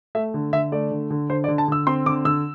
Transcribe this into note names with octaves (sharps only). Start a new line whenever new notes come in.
A3 E5
D3
D3 E5
A3 D5
D3
D3
D3 C5
D5
D3
A5
D3 E6
C4 C6
D3 D6
D3 E6